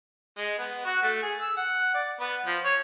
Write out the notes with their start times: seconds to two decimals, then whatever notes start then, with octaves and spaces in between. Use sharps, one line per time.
0.37 G#3
0.58 B3
0.85 F#4
1.03 A3
1.23 G#4
1.41 E6
1.57 F#5
1.94 D5
2.20 B3
2.46 F3
2.65 C#5